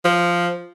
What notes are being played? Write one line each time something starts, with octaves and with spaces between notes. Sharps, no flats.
F3